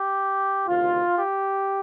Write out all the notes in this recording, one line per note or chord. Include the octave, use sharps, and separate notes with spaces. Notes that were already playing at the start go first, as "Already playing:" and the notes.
Already playing: G4
D2 C3 D#3 F4
G4